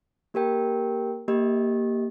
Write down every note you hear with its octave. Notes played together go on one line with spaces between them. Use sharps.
A#3 G4 A#4 G5
A#3 G4 D#5